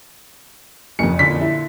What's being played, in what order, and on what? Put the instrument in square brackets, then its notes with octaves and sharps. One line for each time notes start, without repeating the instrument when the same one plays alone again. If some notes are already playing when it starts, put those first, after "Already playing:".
[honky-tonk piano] F#1 F2 [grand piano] C#7
[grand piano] A#2 D3 B6
[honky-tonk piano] E4